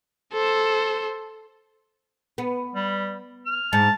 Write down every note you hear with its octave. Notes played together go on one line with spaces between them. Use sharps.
A4 C5
B3
G3
F6
G#2 A5